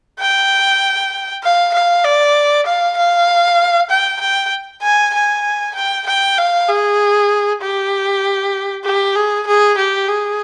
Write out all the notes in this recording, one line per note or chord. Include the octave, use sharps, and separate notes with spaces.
G5
F5
F5
D5
F5
F5
G5
G5
G#5
G#5
G5
G5
F5
G#4
G4
G4
G#4
G#4
G4
G#4